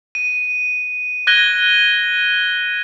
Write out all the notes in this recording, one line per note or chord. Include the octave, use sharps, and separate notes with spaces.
D#7
F#6 G#6 A#6 D#7 G7